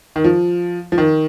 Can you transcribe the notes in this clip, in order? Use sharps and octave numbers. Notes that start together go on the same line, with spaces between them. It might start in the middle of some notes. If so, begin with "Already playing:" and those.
D#3
F3
F3
D#3